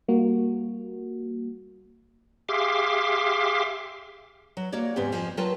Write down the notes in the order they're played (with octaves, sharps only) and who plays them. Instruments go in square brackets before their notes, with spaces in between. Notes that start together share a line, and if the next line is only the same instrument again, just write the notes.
[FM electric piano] G3 A#3 F#4
[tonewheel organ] G4 G#4 E5 F5 C6 D6
[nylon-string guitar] F#3
A#3 F#4 C#5 D5
E2 G#2 C#3 B3 C4 G4
F2 F3 G#5
F#3 F4 A#4 B4 G5 A5